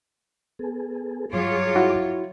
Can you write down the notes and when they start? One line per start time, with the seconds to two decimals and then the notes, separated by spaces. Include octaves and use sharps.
0.59 B3 G#4 A4
1.33 G2 F#3 F4 G#4 C#5 D6
1.76 E4 F#4